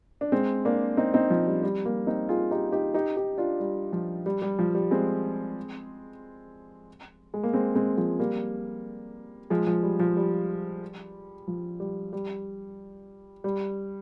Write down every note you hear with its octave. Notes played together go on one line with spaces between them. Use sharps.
D4
G#3 C4
A#3 D4
C4 D#4
C4 D#4
F3
G3
G3
G3 A#3
C4 D#4
F4 G#4
D#4 G4
D#4 G4
D#4 G4
D#4 G4
D4 F4
G3
F3
G3
G3
F3
G3
G#3 C4
G#3
A#3
G#3 C4
G#3 C4
F3 G#3
G3 A#3
F3 G#3
F3
G3
F3
G3
F3
G3
G3
G3